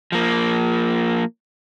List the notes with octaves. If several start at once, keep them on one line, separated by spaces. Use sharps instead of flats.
F3 A#3